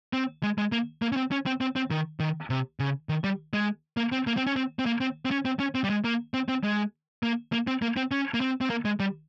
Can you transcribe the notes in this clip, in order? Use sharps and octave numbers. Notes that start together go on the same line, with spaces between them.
C4
G#3
G#3
A#3
A#3
C#4
C4
C#4
C4
C4
C4
D#3
D#3
C3
C#3
D#3
G3
G#3
A#3
C4
A#3
C4
C#4
C4
C4
A#3
C4
C4
C#4
C4
C#4
C4
G3
G#3
A#3
C4
C4
G#3
A#3
A#3
C4
A#3
C4
C#4
A#3
C4
C4
A#3
G#3
G3